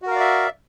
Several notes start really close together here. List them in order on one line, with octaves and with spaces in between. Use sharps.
F#4 A#4 F5 D5 E5